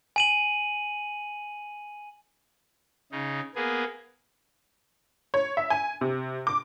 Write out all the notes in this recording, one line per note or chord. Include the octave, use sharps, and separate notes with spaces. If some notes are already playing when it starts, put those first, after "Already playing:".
G#5 D#7 F#7
C#3 D#4
A#3 B3 G#4
C#5
E5
G#5
C3
D6